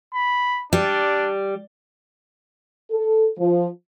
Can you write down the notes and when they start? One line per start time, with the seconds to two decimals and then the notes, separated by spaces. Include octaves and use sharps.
0.14 B5
0.73 G3 D4
2.91 A4
3.38 F3